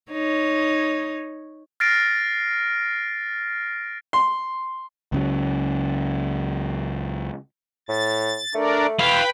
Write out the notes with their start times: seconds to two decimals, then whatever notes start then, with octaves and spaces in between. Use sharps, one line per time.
0.12 D#4 C#5
1.80 F6 A6 A#6 C7 D7
4.13 C6
5.12 C#2 C#3 F#3
7.89 A2 A6
8.55 A3 D4 A#4 D5
8.99 E4 B4 F5 G5 B5